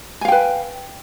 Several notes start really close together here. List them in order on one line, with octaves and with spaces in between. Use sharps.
G#5 F5 G5 B4